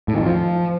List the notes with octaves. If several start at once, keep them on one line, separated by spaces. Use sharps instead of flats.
A2
D#3
F2
F3